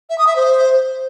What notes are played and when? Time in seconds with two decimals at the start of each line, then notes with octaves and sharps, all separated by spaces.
0.10 E5
0.18 D#6
0.27 E5
0.36 C5